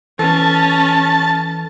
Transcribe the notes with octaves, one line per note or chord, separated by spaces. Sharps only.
E3 C#4 A4 A5